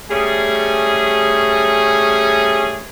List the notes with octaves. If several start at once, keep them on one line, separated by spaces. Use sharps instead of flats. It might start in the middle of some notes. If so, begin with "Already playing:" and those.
G3 A3 C#4 G#4